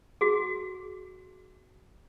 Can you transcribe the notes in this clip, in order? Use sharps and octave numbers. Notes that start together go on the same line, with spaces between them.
F#4 G#4